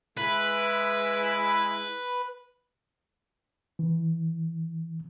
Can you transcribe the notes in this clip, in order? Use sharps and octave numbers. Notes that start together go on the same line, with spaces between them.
G#3 E4 B4
E3